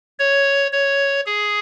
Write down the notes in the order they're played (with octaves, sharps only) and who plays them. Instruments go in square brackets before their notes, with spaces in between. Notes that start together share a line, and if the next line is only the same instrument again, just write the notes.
[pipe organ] C#5
C#5
G#4